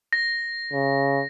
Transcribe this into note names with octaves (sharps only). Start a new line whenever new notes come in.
A#6
C#3